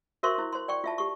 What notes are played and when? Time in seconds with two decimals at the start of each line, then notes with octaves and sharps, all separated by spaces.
0.23 F#4 A#4 C5 E5 C6 C#6
0.38 E4 C5
0.53 C5 C6
0.68 D5 G5 C#6
0.84 F4 E5 A5
0.98 G4 C#6